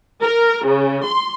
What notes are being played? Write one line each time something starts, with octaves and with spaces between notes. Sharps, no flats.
A#4
C#3
C6